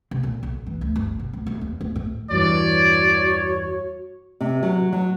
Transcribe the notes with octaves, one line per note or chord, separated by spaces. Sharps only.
C3
A#2
B1
E3
D2
G1
B1
D2
D#1
E2
D1
A2
E2 G2 E3 F#4 C#5 D5
C3
F#3
F#3